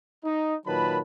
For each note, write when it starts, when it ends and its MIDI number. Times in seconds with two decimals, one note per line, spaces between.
0.24 0.55 63
0.66 0.99 46
0.66 0.99 51
0.66 0.99 54
0.66 0.99 71
0.66 0.99 81
0.66 0.99 83